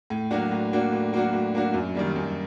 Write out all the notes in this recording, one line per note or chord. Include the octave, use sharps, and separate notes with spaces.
A2
F#3 A#3 D4 F#4
A2
F#3 A#3 D4 F#4
A2
F#3 A#3 D4 F#4
A2
F#3 A#3 D4 F#4
F#2
D#3 G3 A#3
F#2